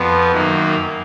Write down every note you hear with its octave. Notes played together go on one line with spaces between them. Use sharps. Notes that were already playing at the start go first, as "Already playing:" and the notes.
Already playing: F2 F3 B3
F#2 D#3 A#3